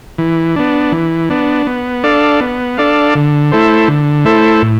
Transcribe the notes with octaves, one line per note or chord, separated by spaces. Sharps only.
E3
B3 D4
E3
B3 D4
B3
D4 A4 D5 F5
B3
D4 A4 D5 F5
D3
A3 E4 A4 C5
D3
A3 E4 A4 C5
A2